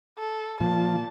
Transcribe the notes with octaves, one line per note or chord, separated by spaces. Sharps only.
A4
A#2 F3 A#3 A5